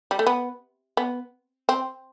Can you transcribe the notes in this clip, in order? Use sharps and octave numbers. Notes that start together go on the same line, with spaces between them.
G3
A3
B3
B3
C4